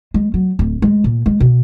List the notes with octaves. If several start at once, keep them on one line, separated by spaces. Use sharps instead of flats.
G#3
F#3
D1
G#3
A#2
G#3
B2